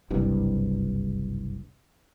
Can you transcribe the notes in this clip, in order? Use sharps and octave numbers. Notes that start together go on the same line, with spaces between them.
F#1 C2 G2